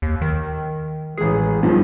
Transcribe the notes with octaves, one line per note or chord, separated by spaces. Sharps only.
D#2
D#3
A1 G#3 G#4
G2 D#3 F3